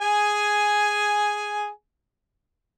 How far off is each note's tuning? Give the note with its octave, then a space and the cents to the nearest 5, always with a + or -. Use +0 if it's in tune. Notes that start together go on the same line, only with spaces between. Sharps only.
G#4 +0 G#5 +5